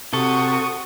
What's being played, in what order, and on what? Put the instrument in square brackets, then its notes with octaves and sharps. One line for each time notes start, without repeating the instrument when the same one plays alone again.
[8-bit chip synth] C3 [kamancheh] F#4 D#6 [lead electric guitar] A4 [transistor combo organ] C#6